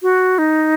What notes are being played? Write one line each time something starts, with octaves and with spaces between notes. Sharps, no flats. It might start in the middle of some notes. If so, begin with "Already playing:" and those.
F#4
D#4